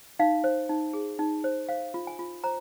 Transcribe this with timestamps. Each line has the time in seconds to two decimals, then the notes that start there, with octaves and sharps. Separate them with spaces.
0.19 D#4 F5
0.44 C5
0.69 D#4
0.93 G#4
1.19 D#4
1.44 C5
1.69 C5 F5
1.94 F4
2.07 G#5
2.19 F4
2.44 C5 A#5